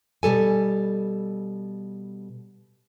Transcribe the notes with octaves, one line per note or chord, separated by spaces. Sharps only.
B2 G3 A4 G#5